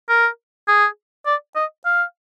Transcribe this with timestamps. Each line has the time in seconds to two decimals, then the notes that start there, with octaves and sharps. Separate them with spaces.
0.09 A#4
0.68 G#4
1.26 D5
1.55 D#5
1.85 F5